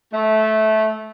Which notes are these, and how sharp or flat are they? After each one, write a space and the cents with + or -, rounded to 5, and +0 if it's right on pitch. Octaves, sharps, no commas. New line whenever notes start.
A3 -15